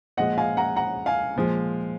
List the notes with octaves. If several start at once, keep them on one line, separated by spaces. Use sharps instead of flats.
A#2 F3 G#3 D#5 F#5
F5 G#5
F#5 A#5
F#5 A#5
F5 G#5
A#2 F3 G#3